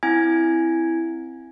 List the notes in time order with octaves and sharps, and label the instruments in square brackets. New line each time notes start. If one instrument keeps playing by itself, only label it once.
[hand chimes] C4 E4 G#5 G#6